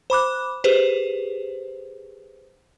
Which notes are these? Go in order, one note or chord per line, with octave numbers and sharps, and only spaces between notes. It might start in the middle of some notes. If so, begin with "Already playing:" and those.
C5 B5 D6 F#6
G4 G#4 B4 C5